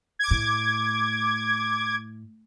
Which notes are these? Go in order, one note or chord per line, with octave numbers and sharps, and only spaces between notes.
D6 G#6
A2